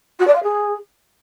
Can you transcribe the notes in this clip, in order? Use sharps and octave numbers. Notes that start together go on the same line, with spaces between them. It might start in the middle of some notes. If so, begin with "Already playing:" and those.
F#4
D5
F5
G#4